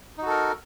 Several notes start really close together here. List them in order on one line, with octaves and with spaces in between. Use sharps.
D#4 F#4 A4 A#4